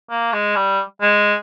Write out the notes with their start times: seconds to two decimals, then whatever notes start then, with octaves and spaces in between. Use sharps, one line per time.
0.10 A#3
0.33 G#3
0.56 G3
1.02 G#3